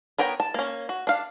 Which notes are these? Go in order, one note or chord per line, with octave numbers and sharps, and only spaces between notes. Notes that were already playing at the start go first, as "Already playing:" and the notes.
B3 A#4 C#5 G5 A#5
A5
A#3 C#4
F#4
D4 F5